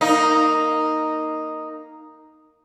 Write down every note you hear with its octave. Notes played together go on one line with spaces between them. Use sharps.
A#3 D#4